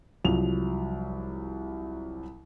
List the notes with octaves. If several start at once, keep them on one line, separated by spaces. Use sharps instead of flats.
C2 F3 F#3 F7